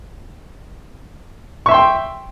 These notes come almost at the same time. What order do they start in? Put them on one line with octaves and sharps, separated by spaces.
C#6 E5 C6 G5